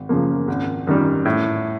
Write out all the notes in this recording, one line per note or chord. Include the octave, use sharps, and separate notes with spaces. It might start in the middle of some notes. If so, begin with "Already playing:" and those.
Already playing: G#1
F#2 C#3 F3 A#3
G#1
F#2 D#3 G3
A2